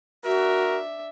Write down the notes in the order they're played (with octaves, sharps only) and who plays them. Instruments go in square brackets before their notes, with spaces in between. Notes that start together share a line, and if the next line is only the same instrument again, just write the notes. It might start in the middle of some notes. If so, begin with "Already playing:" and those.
[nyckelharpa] D4 E5 [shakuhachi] F#4 [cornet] A#4